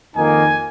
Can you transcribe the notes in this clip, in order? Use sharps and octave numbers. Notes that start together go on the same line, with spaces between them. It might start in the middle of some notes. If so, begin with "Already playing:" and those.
F2 D#3 A#3 D#4 G#5